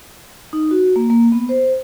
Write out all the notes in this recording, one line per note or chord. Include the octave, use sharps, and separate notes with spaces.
D#4
F#4
A#3
A#3
B3
C5